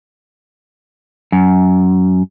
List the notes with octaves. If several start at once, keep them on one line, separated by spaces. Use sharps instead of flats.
F#2